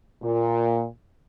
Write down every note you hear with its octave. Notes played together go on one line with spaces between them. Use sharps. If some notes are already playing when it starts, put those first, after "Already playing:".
A#2